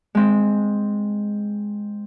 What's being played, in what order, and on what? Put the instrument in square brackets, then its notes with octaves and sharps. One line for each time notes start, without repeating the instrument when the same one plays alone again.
[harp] G#3 C4